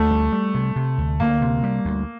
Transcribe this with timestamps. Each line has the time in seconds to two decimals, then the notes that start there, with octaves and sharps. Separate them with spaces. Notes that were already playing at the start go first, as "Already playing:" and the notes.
Already playing: D2 A3
0.11 G3
0.32 G3
0.55 C3
0.76 C3
0.98 D2
1.20 D2 A#3
1.42 C3
1.63 G3
1.85 D2